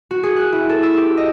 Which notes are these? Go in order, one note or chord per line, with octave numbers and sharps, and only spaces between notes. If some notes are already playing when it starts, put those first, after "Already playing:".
F#4
G#4
F#6
E4
A4
E6
G4
D#5